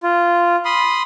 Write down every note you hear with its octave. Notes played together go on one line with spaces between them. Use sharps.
F4
B5 C6 D#6